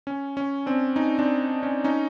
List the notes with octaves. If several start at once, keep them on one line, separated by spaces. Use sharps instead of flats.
C#4
C#4
C4 D4
C#4 D#4
C4 D4
C#4
C#4 D#4